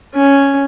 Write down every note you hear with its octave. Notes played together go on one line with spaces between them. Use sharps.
C#4